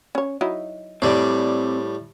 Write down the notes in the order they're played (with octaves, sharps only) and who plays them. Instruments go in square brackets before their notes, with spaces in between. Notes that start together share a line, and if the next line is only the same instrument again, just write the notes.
[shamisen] C#4 C#5
F#3 D#4 E4
[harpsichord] A2 G3 [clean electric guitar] C4 D5